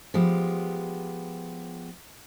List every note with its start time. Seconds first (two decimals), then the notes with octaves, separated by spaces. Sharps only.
0.14 F3 G#3 B3 G4